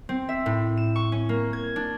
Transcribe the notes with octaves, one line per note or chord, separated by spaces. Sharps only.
C4
E5
A2
E7
C#6
C#4
A#3
G#6
D4